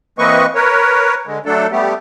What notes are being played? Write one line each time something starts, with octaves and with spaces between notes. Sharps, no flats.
E3 A#3 C4 B4 D#5 C#6
A#4 B4 C#5
D3 G#3
F#3 A3 D4 A4
G3 A3 B3 G4